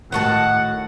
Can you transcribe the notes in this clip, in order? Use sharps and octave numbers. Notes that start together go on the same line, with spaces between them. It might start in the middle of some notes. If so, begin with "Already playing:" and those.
A2 D#3 F#4 F#5 A5